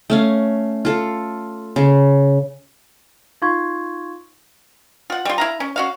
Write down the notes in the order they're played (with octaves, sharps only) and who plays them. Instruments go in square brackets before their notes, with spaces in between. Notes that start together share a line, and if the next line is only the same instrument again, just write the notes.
[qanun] A3 C#4 F5
F4 A4
C#3
[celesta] D#4 F4 F5 C6 C#6 G#6
[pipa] F4 F#5
G3 F4
E4 F5 A#5
C#4
C#4 F#4 F5